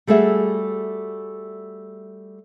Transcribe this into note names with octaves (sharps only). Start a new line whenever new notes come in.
G3 A3 F#4 G#4 E5